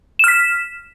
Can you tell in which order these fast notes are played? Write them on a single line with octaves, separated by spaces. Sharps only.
E7 F6 B6